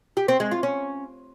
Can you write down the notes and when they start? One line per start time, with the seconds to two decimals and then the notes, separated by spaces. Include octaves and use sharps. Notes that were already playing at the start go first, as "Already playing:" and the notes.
0.17 G4
0.28 C4
0.40 G#3
0.51 F4
0.63 C#4